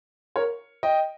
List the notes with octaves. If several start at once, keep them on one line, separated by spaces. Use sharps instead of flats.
A#4 C#5
D#5 G5